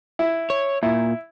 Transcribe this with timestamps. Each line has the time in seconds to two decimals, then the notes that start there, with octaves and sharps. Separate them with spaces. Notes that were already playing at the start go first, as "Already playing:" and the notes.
0.19 E4
0.50 C#5
0.83 A#2 E4